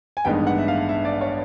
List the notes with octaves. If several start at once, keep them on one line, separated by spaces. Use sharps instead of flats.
G#5
A1 G2 D#3 G#3 B3 G5
F#5
E5
F5
E5
D5
C#5